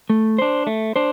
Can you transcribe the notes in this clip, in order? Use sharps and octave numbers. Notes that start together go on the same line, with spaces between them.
A3
D4 C5
A3
D4 C5